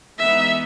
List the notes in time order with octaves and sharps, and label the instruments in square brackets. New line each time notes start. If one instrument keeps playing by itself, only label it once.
[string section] E3 G#3 B3 D#4 [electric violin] E5